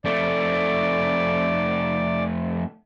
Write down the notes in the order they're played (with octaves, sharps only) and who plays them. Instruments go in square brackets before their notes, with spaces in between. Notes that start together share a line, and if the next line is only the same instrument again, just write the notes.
[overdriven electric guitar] F2 A3 [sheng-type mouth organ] D5